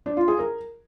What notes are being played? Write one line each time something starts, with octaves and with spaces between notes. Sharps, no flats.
D4
F4
G#4
A#4